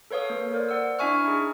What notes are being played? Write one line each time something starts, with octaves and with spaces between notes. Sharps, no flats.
A4 B4 C#5 F5 D#6
A#3
A#4 C5 D5
D5 F#5 E6
D4 E4 E5 G#5 C#6 F6
D#4 G#4